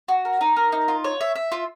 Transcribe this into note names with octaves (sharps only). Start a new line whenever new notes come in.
F#4
A#4
D#4
A#4
D#4
F4
C#5
E5
E5
F4